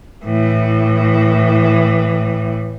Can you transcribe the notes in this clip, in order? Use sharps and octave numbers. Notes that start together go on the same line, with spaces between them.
A2 E3